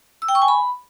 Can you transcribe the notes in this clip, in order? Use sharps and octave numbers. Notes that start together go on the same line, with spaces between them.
E6
G5
C#6
G#5
B5